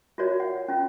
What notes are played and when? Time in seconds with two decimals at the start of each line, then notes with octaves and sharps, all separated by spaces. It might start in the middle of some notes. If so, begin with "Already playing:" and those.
0.18 F4 F#4 A#4 C#5 D5
0.40 F#5
0.68 C#4 F4